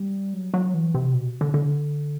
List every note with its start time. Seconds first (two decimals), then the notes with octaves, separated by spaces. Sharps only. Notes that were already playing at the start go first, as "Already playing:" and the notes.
Already playing: G3
0.34 F#3
0.54 F#3
0.74 E3
0.94 C3
1.13 B2
1.41 D3
1.54 D3